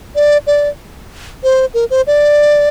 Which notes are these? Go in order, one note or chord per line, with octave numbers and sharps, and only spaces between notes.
D5
D5
C5
A#4
C5
D5